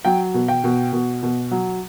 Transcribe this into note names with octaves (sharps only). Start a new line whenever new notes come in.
F#3 G5
B2
G5
B2
B2
B2
F#3